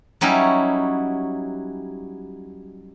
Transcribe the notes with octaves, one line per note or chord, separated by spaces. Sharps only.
F#3 G3 C#4 D#4 E4 F#4